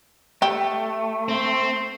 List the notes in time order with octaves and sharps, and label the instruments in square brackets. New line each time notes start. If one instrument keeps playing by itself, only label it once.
[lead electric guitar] A3 [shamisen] G4
[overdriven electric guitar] C4 [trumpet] C6